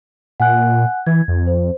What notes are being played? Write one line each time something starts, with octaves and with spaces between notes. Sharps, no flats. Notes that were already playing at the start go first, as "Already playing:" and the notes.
A#2 F#5 G#5 F#6
E3 G#6
F2
C5